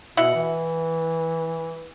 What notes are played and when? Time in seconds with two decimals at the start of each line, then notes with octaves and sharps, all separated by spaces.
0.17 B2 E4 D#5 F#5
0.35 E3